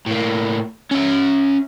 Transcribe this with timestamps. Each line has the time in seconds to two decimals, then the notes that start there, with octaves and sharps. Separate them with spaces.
0.07 A2 A#3
0.91 C#4 E5